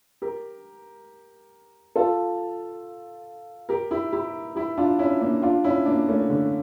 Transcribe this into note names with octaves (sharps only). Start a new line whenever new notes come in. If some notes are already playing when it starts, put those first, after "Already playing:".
G4 A#4
F4 A4
G4 A#4
E4 G4
E4 G4
E4 G4
D4 F4
C#4 E4
A#3 D4
D4 F4
C#4 E4
A#3 D4
A3 C#4
D3